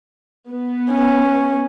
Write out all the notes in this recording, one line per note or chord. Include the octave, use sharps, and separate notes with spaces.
B3
C#4